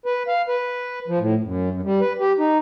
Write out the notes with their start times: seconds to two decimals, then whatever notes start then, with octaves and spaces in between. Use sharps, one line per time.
0.06 B4
0.28 F5
0.48 B4
1.08 F3
1.19 A2
1.44 F#2
1.71 F#2
1.84 G3
2.01 B4
2.20 G4
2.39 D#4